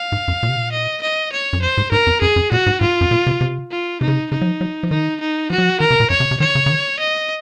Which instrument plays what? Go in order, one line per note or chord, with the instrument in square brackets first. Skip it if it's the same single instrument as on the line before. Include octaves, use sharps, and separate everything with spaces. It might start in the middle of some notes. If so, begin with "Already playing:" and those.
Already playing: [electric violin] F5
[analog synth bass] G#2
F#2
A#2
C3
A#2
[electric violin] D#5
D#5
C#5
[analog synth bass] F#2
[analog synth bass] F2 [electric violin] C5
[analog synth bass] G#2
[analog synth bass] G#2 [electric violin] A#4
[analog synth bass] F2
[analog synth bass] F#2 [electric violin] G#4
[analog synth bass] F#2
[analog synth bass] A#2 [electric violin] F#4
[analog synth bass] G#2
[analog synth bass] G#2 [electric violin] F4
[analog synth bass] F#2
A#2
C3
C3
[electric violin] F4
[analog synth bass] C3 [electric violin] D#4
[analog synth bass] C#3
C3
[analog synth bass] C#3 [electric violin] D#4
[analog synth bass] F#3
F3
F#3
F3
[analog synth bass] D#3 [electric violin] D#4
[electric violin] D#4
[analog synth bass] F3 [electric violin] F#4
[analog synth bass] F#3
F3
[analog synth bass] D#3 [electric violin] A#4
[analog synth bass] C3
A#2
[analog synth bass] F#2 [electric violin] C#5
[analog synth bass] C3
C3
[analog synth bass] D#3 [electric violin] C#5
[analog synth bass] C#3
C#3
D#3
[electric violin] D#5